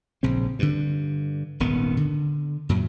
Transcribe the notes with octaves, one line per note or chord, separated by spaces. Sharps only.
A#1 C#3 C4
G2 D3
D#1 G#1 D#3 B3
D3
F#2 A#2 F#3